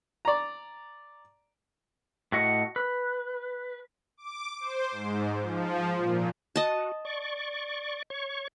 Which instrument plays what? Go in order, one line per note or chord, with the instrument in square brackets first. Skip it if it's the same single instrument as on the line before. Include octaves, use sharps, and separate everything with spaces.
[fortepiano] D5 A#5
[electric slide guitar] A2 F#4 D#5 F#5
B4
[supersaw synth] D6
C5
G#2
F3
A#2
[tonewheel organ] F#4 [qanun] D#5 A5
[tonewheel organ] D5 C#6
C#5 C#6